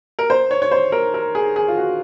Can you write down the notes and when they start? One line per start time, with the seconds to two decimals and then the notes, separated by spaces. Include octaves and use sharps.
0.19 A#4
0.30 C5
0.51 C#5
0.62 C#5
0.71 C5
0.92 A#4
1.14 A#4
1.35 G#4
1.56 G#4
1.68 F4
1.78 F#4